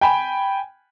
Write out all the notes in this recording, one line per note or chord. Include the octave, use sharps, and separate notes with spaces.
G5 G#5 B5